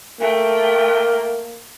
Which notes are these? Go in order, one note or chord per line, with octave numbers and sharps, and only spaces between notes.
A3 A#3 G5